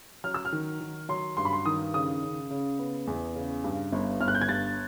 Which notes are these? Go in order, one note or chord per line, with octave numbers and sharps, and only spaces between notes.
F#3 F6
E6
F6
D#3
D#3
F#3 C6
G2 C6
B5
C6
D#3 D#6
C#3 D#6
C#3
C#3
B3
E2
C#3
G2
G1
G1 F6
F#6
G6
G#6
G2 A6